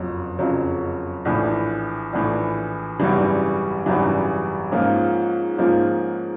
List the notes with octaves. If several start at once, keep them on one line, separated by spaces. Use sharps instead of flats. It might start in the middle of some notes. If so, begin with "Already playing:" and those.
Already playing: F#1 F2 C#3 F#3
F#1 F2 C#3 F#3
A#1 A2 E3
A#1 A2 E3
G#1 F#2 C#3 E3 G3
G#1 F#2 C#3 E3 G3
G#2 F3 A#3 C#4 F4
G#2 F3 A#3 C#4 F4